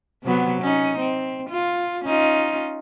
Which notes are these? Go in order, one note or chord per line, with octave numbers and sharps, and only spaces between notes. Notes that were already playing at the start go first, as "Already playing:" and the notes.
C3 F#3 B3
C#4 D#4
C4
F4
C#4 D#4 F4